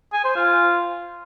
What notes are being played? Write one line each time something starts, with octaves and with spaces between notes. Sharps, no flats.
G#5
C5
F4